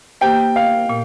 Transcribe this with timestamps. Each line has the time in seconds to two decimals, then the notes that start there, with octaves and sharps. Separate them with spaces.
0.21 A#3 G4 C5 G5
0.56 F5
0.89 A#2